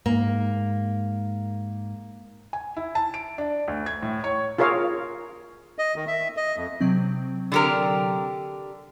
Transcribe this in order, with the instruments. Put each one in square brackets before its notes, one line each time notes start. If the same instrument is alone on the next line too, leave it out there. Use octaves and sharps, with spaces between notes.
[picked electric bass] G#2 [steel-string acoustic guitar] A#3
[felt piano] G#5
E4
A5
D7
D4
D2
G#6
A2
C#5
[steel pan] F4 G#4 A#4 C#5 F5
[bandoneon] D#5
D#3
E5
D#5
F2
[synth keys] C3 F#3 C4
[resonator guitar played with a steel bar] D3 G4 A#4